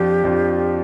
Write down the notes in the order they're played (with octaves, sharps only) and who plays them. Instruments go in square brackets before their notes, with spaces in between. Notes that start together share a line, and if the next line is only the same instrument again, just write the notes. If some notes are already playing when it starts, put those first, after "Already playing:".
Already playing: [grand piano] F2 F3 D4 F4 [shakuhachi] G4
[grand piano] F2 F3 D4 F4